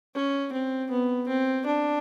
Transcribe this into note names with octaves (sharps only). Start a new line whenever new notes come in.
C#4
C4
B3
C4
D4